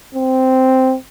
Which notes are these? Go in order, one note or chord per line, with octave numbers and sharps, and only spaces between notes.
C4